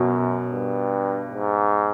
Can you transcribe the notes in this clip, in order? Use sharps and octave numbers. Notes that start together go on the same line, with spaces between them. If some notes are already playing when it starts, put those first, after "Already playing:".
Already playing: F#2 B2
G2
G#2